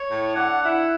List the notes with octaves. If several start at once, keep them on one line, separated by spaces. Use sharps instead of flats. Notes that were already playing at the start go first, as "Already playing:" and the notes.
Already playing: C#5
A2
D3 F#5
E4 F#5